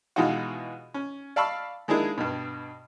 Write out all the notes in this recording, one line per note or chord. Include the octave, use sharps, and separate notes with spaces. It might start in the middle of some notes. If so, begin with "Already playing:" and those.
B2 E3 G#3 D#4 F4 F#4
C#4
D5 F5 A5 B5 C#6 E6
D#3 G#3 A#3 D4 E4 G#4
G2 B2